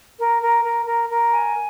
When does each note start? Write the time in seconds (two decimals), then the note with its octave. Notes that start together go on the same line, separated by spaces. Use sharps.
0.19 A#4
0.42 A#4
0.64 A#4
0.87 A#4
1.10 A#4
1.32 G#5